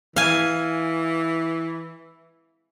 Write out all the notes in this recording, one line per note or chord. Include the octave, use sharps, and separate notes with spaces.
E3 F5 G#5